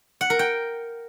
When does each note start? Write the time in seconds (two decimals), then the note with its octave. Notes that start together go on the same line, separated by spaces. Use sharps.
0.21 F#5
0.30 A#4
0.39 G5